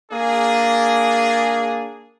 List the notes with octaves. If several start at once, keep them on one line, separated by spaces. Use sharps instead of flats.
A#3 D4 G#4